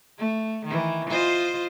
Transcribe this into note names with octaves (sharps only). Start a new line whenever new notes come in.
A3
D#3 E3
F4 C5 D#5